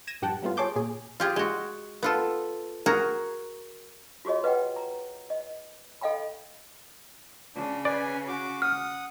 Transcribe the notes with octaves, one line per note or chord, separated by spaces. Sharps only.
G#6 A#6 D#7 E7
A#1 G2 G4 F#5 G5 A5
F#3 G3 A3 B3 F4
G#4 C#5 A5 C6 D6 G6
A#2 G#4
F4 G4 G#4
G#3 F#4
B3 F4 A4
F#4 G#4 A#4 A#5
F4 F#4 G#4 C#5 D#5
B4 D#5 F#5 G5
A#5
D#5
A4 D#5 F5 G5 B5
C#3 D4
B4 D5 G#5
F#4 D6
F#5 D#6 F6